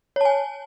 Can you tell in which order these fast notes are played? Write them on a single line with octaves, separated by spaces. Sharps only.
C#5 A5 G#5